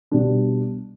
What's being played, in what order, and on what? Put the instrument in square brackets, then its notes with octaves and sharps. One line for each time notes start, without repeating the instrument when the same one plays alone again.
[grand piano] B2 G3 D4